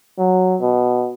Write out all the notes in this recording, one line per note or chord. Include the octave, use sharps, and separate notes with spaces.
F#3
B2